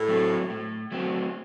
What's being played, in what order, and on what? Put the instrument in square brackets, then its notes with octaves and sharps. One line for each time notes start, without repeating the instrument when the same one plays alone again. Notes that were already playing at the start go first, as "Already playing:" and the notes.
Already playing: [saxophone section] A2
[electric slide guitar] F#3 A3 C4
A2
F#3 A3 C4